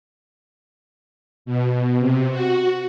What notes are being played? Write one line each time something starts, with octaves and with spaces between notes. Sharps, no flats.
B2
C3
F#4